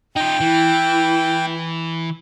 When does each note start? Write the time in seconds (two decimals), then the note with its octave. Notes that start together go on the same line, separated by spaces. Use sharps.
0.16 D#4 F4 G5
0.41 E3 E4